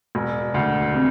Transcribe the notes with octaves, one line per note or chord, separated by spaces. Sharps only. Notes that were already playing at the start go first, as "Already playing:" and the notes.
E1
D2
C3